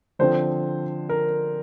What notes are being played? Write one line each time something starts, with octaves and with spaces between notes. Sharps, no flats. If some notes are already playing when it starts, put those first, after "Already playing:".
D3 F3 C4 C5
A#4